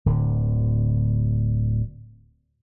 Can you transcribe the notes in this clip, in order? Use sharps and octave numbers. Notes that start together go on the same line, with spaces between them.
D1 D3